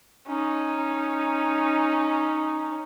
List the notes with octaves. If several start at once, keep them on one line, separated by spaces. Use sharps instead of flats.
C#4 D#4